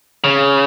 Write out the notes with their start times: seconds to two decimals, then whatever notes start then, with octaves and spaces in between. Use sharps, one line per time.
0.24 C#3